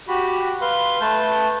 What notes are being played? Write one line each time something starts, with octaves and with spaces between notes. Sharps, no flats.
F#4 G4 B5
B4 F5 C6
A3 B4 A5 G6